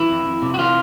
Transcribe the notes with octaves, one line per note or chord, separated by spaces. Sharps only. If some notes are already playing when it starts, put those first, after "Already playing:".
Already playing: E3 E4
F2
F2
C3
F#4
E3 F4